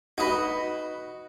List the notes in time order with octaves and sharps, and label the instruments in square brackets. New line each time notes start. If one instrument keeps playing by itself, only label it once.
[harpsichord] D#4 B4 [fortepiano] F#4 D#5 B5